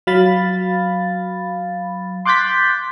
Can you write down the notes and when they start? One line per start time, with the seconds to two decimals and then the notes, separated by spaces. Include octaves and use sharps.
0.07 F#3 F5 B5 A6
2.25 C6 D6 F#6 G6 A6 B6